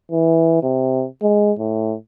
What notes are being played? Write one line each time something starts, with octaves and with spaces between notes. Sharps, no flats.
E3
C3
G#3
A2